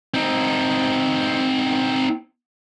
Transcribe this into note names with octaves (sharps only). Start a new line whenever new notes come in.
C4 D#4